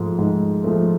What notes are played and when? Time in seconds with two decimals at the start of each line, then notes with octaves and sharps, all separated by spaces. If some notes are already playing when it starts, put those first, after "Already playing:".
Already playing: G#2 F3 A3
0.19 G#2
0.64 F3 A3